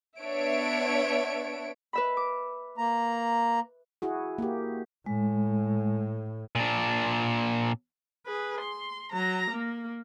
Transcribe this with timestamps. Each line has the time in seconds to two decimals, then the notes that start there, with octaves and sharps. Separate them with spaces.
0.20 B3 D4 C#5 E5 D7
1.93 B4 E5 B5
2.17 D6
2.78 A#3 A#5
4.02 E4 F#4 G#4
4.38 A#3 G4
5.06 A2 G#3
6.55 A#2 D4
8.26 G#4 B4
8.61 C6
9.12 F#3 A#5
9.51 A#3